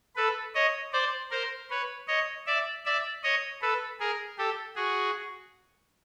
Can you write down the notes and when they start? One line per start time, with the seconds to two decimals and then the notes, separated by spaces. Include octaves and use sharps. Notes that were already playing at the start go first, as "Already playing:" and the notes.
0.16 A4 B4
0.55 C#5 D#5
0.92 C5 D5
1.31 A#4 C5
1.70 B4 C#5
2.08 C#5 D#5
2.46 D5 E5
2.85 D5 E5
3.23 C#5 D#5
3.62 A4 B4
4.00 G#4 A#4
4.38 G4 A4
4.76 F#4 G#4